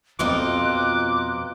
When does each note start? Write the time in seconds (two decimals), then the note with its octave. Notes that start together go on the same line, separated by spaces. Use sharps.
0.19 F2 B2 F3 C4 D#4 F4 D6 F#6